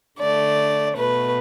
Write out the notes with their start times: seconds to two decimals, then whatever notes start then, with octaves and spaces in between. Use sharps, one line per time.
0.18 D3 A3 D5
0.96 B2 A3 B4